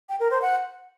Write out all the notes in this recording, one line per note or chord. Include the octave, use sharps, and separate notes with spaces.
G5
A#4
C5
F#5